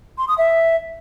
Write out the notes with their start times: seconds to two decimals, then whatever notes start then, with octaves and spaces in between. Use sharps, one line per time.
0.18 C6
0.28 D#6
0.38 E5